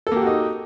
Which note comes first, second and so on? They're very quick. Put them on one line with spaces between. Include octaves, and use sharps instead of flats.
A4 A#3 G4 F#4 D#4